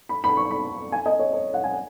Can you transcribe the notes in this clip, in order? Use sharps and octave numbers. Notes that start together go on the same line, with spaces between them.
B5
B5
C#6
B5
G#5
D#5
C#5
C#5
F#5
G#5